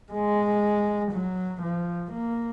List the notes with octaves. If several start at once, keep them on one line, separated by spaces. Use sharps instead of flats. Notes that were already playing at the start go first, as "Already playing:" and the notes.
G#3
F#3
F3
A#3